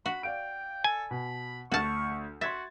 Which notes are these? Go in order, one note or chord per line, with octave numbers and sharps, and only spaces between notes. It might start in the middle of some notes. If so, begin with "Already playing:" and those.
F#4 B5
D5 F5 G5 D7
A4 G#5
B2 B5
D2 F#4 A5 C#6 F6
F#4 E5 C6 G#6 A6